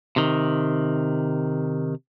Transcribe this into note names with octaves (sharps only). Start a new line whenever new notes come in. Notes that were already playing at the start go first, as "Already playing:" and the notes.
C3 D#3